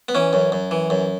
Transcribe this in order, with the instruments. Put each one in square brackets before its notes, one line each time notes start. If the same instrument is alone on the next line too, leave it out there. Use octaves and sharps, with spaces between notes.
[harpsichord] B3
E3 C#4
F#2
F#2
E3
F#2